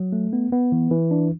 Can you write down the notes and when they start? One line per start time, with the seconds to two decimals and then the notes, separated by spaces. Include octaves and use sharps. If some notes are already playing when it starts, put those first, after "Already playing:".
Already playing: F#3
0.12 A3
0.33 B3
0.52 B3
0.72 E3
0.91 E3
1.11 D4